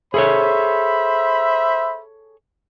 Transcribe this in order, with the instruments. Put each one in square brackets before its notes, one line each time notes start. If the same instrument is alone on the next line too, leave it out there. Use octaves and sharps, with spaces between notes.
[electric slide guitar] G#4 A4 C#5 [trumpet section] C5 E5 B5